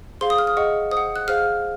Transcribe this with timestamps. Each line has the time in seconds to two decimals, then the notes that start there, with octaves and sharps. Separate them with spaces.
0.21 G#4 C5 F5 C6
0.30 D#6
0.38 F6
0.47 D#6
0.57 G#4 D#5 F#5 C#6
0.91 C5 D#6
0.97 F#5
1.16 F#6
1.28 G#4 C5 F5 F6